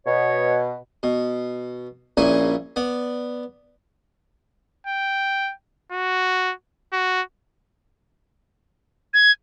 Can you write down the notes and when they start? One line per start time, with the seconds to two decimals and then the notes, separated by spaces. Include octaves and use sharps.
0.07 B2 C#5
1.03 B2
2.17 A#1 A#2 C#3 E4 G#5 C#6
2.76 B3 D5
4.87 G5
5.92 F#4
6.93 F#4
9.14 G#6